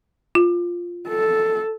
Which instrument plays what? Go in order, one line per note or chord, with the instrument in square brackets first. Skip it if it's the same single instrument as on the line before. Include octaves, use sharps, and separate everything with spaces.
[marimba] F4
[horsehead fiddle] A4